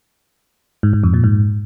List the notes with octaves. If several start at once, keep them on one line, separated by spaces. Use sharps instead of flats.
G#2
G#2
F2
A#2
G#2